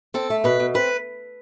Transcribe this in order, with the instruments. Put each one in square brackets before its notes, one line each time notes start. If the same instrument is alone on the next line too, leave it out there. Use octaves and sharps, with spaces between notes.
[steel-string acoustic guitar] C4 A4
A3
B2 B4
B2
C4 B4